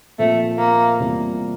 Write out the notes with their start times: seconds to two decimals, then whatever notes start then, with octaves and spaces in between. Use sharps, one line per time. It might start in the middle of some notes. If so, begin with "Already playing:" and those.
0.19 A#2 F3 A3 C4 F4
0.59 A#3
0.99 E2 C3 G3 A#3 F4